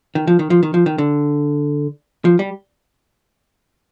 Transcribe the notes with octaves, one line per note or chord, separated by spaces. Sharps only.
D#3
F3
D#3
F3
D#3
F3
D#3
D3
F3
G3